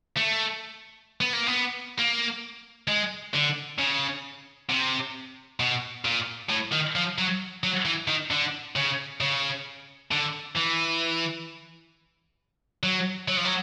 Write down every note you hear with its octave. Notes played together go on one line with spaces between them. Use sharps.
A3
B3
A#3
B3
A#3
G#3
D3
C#3
C3
B2
A#2
A2
D#3
F3
F#3
F#3
E3
D#3
D3
C#3
C#3
D3
E3
F#3
F#3
F3
F#3